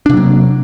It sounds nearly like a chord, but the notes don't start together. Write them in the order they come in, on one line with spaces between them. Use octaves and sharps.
D4 C3 F#3 A#3